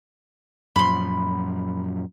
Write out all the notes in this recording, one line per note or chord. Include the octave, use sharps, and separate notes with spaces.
F#2 A#2 F3 B5 C6